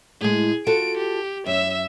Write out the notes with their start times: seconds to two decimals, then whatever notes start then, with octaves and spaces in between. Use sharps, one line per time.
0.21 A2 G#3 G#4
0.67 F4 F#4 A4 D7
0.97 G4
1.46 F#2 E5 E6